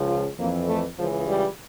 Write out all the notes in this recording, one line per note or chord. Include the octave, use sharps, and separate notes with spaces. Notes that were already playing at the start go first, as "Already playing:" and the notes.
Already playing: C#2 C#3 F3
F4
F2 E3 A#3
A3
C#2 C#3 E3 F3
G3